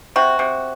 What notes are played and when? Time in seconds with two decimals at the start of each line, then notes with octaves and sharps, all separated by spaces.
0.16 C3 F#4
0.39 C3